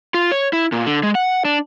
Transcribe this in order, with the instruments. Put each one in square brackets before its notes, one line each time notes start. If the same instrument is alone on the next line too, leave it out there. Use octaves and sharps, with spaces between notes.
[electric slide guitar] F4
C#5
E4
A#2
D3
G#3
F#5
D4